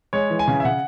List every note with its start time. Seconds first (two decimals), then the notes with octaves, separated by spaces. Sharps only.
0.13 G#3 C#5
0.30 E3
0.39 G#5
0.48 C#3
0.60 E5
0.65 C#3 F#5